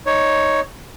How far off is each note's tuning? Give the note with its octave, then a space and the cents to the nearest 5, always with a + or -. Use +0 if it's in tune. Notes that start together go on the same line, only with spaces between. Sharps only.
D#4 +0 C#5 +0